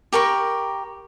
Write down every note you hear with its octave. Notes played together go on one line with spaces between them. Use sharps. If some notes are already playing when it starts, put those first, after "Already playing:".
G4 A#4 B5 C#6